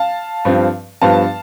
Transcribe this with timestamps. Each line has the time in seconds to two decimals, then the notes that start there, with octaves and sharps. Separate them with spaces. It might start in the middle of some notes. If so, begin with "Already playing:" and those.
Already playing: F5 A5
0.45 G2 F3 C4
1.02 G2 F3 B3 F5 A5